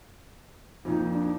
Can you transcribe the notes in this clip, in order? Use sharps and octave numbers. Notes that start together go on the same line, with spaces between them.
F2 A#2 D#4
D4